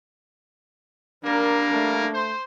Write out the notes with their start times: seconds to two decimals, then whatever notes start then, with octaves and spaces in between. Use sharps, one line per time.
1.25 G3 A#3 D4 A#4
1.73 A3
2.14 C5